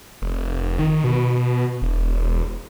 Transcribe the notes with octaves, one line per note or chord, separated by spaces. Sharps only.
F1
D#3
B2
E1